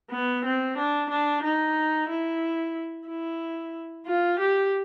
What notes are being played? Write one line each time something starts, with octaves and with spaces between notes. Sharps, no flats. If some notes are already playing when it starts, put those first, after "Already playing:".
B3
C4
D4
D4
D#4
E4
E4
F4
G4